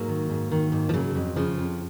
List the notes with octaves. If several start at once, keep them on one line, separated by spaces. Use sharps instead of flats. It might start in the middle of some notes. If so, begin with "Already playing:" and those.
Already playing: G#2 F#3 A#3
D#3
G#2
D#3
G#2
F3
C#3 F#3
F2
C#3 F3
F2